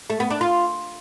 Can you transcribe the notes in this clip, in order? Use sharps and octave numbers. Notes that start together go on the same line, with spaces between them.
A3
B3
D4
F4